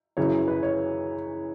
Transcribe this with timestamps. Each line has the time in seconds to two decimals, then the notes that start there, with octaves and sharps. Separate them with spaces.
0.17 F#2 C#3 E3 C#5
0.48 B4
0.63 C#5